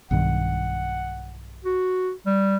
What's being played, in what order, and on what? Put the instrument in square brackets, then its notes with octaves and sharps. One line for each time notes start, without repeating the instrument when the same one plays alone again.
[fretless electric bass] B1 G2 D#3 [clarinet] F#5
[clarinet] F#4
G3